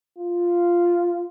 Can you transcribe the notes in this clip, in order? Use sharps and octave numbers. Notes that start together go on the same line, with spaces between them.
F4